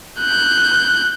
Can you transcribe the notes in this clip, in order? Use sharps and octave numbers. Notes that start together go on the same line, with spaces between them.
F#6 G6